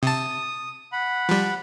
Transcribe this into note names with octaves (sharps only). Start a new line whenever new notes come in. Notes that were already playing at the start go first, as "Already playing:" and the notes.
C3 A5 D#6
F#5 B5
F3 G3